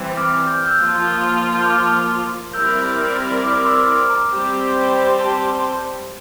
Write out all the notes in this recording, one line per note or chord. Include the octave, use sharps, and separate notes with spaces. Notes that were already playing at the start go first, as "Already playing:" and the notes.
Already playing: E3 G3 C4
D6 F6
G6
F6
E6 G6
F3 A#3 F4
G6
D6 F6
G3 C4 E4 A#4 D5 E6 G6
D6 F6
D6
C6 E6
D6 F6
A#5 D6
G3 C4 G4 C5
A5 C6